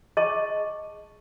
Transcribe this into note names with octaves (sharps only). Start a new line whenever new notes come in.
G#4 D#5 A5 C#6